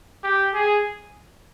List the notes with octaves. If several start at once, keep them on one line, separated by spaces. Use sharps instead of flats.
G4
G#4